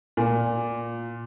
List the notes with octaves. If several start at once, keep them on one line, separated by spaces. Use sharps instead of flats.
A#2